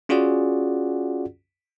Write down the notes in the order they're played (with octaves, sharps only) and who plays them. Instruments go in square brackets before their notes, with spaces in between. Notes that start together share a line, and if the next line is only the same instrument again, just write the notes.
[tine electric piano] C#4 F4 F#4 G#4 D5 F#5